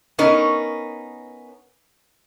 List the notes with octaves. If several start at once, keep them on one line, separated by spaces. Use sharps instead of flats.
B3 C#4 D#4 A#4